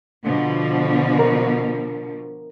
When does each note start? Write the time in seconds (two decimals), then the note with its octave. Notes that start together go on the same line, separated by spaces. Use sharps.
0.24 B2 D3 F3
1.19 A#4